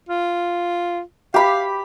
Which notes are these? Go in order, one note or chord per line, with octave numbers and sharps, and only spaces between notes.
F4
G4 F5 B5